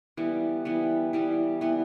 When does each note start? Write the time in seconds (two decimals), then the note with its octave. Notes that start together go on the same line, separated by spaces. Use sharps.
0.17 E3 G3 B3
0.65 E3 G3 B3
1.13 E3 G3 B3
1.61 E3 G3 B3